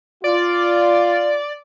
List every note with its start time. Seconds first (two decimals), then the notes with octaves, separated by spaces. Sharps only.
0.24 F4 D5